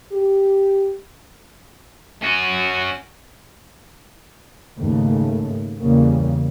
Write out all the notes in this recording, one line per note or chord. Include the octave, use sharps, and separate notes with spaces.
G4
C#4 F#4
D#2 G#2 C#3 A3
E2 C#3 G3 A#3